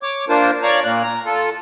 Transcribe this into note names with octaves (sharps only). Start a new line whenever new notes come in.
C#5 D6
A#3 D4 F4 A#4 C5
C#5 D5 F5 A#5 C#6
A#2 A#3 F#6
A#5
F4 A4